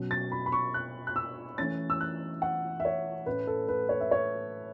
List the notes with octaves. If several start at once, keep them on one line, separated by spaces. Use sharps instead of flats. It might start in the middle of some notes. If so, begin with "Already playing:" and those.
Already playing: B2 F#3 C#4
A6
B5
B5
C#6
F#6
F#6
E6
E3 A3 C#4 A6
E6
F#6
F#5
E5
C#5
A2 A3 C#4 B4
A4
B4
C#5
E5
C#5